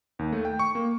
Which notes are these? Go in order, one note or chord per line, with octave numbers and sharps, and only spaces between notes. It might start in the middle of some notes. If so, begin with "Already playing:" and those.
D#2
A3
G5
C#6
A#3